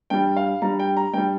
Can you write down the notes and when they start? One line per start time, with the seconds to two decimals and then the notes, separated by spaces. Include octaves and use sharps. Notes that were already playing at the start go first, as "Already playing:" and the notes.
0.10 G2 G3 G5
0.36 F5
0.62 G2 G3 A#5
0.79 G5
0.97 A#5
1.14 G2 G3 G5